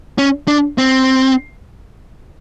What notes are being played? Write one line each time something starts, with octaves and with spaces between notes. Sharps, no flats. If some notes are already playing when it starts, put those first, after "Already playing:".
C#4
D4
C4